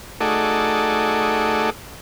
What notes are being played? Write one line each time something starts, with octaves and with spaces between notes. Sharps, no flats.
A3 D#4 F#4 G#4 A4 D5